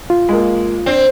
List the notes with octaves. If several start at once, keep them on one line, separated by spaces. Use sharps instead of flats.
F4
G#3 A#3
C4 D4